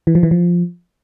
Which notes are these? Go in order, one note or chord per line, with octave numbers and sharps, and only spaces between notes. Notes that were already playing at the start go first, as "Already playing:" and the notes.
E3
F3
E3
F3